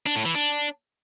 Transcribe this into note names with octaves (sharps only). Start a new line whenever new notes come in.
D4
A2
E3
D4